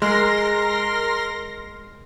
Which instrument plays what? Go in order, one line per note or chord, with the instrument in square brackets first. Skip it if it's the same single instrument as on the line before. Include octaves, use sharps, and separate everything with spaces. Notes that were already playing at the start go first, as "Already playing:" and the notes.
[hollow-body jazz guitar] G#3 [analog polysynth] A#4 C6 A#6